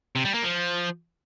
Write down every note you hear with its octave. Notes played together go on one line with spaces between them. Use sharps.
C3
G3
A#3
F3